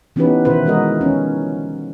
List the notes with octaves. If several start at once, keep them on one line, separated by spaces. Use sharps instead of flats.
E3 B3 C#4 D#4 G4 B4
B2 D#3 E4 B4 C5
E3 G#3 F#4 A#4 D#5
F3 C#4